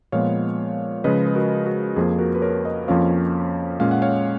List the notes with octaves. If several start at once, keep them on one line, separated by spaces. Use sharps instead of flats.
A#2 F3 G#3 B3 C#5 F5
C#3 F3 G#3 B4 D#5
B4
F#4 A#4
F#4
F2 F3 A#3 G#4
F#4 A#4
B4
A#4 C#5
B4 D#5
F2 F3 A#3 C#4 F4 C#5 F5
A#2 G#3 C#4 F5
F#5
C#5 F5